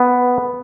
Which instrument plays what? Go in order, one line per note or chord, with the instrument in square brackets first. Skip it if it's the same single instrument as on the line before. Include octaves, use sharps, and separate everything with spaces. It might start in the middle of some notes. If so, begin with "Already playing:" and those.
Already playing: [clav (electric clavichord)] B3